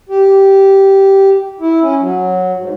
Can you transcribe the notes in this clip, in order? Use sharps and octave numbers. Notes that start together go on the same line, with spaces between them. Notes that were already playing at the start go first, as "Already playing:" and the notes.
G4
E4
C#4
F#3
G#2